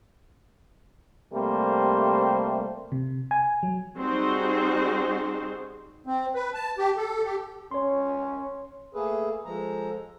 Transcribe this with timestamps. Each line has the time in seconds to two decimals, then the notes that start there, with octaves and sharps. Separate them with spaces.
1.33 C3 G3 A3 A#3 C5
2.92 C3
3.31 G#5
3.63 F#3
3.98 G3 C4 D#4 F#4 G#4 C5
6.07 C4
6.34 B4
6.54 A5
6.78 G4
6.97 A4
7.24 G4
7.71 C#4 C#5 C6
8.94 A3 A#3 G#4 A4 B4
9.45 F3 G#3 A4 A#5